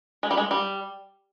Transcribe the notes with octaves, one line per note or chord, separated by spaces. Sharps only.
G#3
G3
G#3
G3